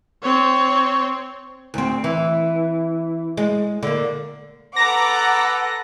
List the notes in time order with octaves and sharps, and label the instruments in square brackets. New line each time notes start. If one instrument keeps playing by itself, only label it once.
[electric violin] C4 C#5
[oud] D2 C4
E3
G#3
D3 A#3
[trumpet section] A4 B4 [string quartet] F#5 [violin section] A#5 D6 [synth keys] A#6